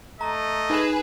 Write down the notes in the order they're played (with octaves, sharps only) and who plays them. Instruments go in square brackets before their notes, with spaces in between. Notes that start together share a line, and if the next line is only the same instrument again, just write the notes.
[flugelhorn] A3 [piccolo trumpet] D#5 [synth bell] A#5
[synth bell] D#4 E7 [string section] G#4 B4